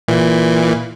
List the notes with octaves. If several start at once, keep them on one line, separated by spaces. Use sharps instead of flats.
A#2 E3